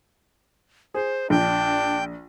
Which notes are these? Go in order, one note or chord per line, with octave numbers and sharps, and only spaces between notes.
G#4 C5
A#1 D4 G5